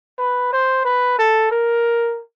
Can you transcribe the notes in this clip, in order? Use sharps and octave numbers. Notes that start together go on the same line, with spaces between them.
B4
C5
B4
A4
A#4